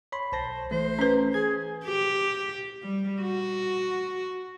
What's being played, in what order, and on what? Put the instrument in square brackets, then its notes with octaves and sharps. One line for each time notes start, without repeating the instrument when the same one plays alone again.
[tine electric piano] C#5 B5 C6
[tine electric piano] B1 A5 A#6 [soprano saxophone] C5
[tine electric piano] E3 A3 [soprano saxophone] C5
[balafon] C#4 B4
[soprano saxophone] G#4 [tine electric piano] G#6
[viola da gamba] G4
G3
F#4